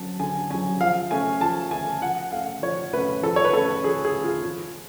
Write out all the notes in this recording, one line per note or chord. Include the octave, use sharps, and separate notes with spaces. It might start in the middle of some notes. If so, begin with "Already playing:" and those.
Already playing: D3 F#3 C#4 A5
D3 G#5
F#3 C#4 G#5
F3 F5
A3 C#4 G#5
F3 A5
A3 C#4 G#5
F3 F#5
A3 C#4 F5
F3 C#5
A3 C#4 B4
F3 A4
C#5
B4
A3 C#4 A4
F3 G#4
G#4
A3 C#4
F4
F3 F4